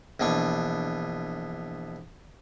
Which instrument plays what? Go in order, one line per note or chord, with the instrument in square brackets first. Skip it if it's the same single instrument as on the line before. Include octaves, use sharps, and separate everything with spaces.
[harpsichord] A#1 B2 E3 D4 C#6